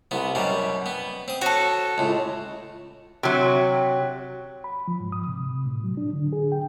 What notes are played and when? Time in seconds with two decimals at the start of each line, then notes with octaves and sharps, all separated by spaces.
0.11 C2 B3
0.35 F#2 B2 G3
0.86 B3
1.28 C4 D#6
1.41 F#4 A4 C#5
1.98 C#2 A2
3.23 C3 F#3
4.64 B5
4.88 F3
5.00 G#2
5.12 D#6
5.27 C3
5.51 C3
5.66 A2
5.84 F#3
5.97 D4
6.13 D3
6.33 G#4
6.52 G5